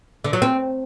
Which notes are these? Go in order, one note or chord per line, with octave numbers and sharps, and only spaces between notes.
D3
F#3
C4